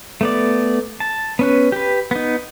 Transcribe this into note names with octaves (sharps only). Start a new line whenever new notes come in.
A3 B3 D5
A5
B3 C#4 B4
G4 B4
B3 D#4